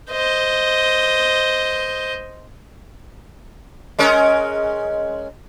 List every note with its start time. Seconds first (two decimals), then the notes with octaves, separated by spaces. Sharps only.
0.11 C5 D#5
3.99 G#3 C#4 A#4